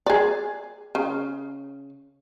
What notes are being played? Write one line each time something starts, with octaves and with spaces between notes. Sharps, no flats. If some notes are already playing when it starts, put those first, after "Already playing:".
G#4 D5
C#3